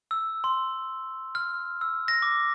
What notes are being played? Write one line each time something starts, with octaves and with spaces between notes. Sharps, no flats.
E6
C6
F6
E6
A#6
D6